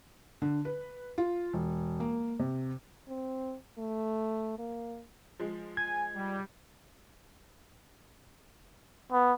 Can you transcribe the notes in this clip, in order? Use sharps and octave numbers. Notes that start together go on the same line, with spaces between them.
D3
B4
F4
E1
A#3
C3
C4
A3
A#3
F3 G#3
G#5 G#6
G3
B3